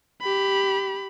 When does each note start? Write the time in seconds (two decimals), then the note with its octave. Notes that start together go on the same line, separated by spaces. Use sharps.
0.21 G4 B5